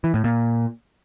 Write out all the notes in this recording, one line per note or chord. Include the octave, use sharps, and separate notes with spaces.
E3
A2
A#2